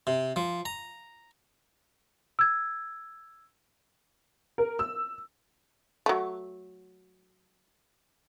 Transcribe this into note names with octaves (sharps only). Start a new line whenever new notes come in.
C3
F3
A#5
E6 G#6
A#4
E6
F#3 A3